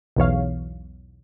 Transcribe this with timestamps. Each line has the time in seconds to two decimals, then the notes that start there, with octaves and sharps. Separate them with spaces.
0.16 B1 E2 E3 C#5 F5